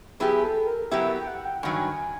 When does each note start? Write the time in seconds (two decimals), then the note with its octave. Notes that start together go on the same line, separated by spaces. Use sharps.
0.19 F#3 B3 E4 G4 G#4
0.43 A4
0.67 A#4
0.91 F#3 B3 E4 G4 E5
1.18 G5
1.27 F#5
1.45 G5
1.63 G2 D#3 F#3 G#5